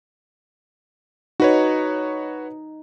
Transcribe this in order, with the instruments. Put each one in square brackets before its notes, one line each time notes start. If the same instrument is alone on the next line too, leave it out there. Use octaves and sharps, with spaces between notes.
[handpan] D#4 [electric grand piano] F#4 B4 C#5